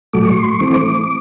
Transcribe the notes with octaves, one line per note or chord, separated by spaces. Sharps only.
A2 F#3 A3 D6
C#6
C6
C#6
E3 A3 C4 D6